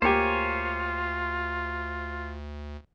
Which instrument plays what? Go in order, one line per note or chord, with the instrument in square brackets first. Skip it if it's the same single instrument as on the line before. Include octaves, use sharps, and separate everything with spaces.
[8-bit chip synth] D2 [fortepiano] A#3 G4 [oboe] F4 [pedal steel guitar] C5 C#5 G#5